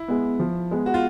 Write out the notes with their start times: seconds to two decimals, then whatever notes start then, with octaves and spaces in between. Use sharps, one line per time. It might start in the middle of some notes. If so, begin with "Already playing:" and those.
Already playing: E4
0.08 G#3 B3
0.39 F3
0.71 G#3 B3
0.86 F#4
0.94 F4